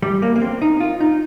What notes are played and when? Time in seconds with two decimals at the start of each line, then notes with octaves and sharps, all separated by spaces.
0.02 G3
0.22 A#3
0.36 A#3
0.41 C4
0.62 D#4
0.80 F4
1.01 D#4